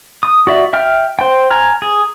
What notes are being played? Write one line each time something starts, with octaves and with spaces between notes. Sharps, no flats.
D#6
F#4 D5 E5
E5 G5 F6
C5 G5
G#5 A#5 F6
G#4